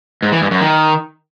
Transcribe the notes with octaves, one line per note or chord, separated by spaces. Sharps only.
G#2
E3
G2
F#2
D#3